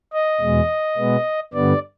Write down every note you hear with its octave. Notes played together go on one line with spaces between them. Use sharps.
D#5
E2 B2 G#3
B2 G#3 B3
G2 D3 G3 B3 D5